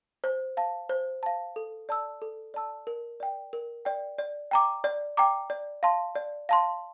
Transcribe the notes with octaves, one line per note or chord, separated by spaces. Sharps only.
C5
F5 A5
C5
F5 A5
A4
D5 A5 E6
A4
D5 A5 E6
A#4
D5 G5
A#4
D5 G5
D5
G5 A#5 D6
D5
G5 A#5 D6
D5
F5 A5 C6
D5
F5 A5 C6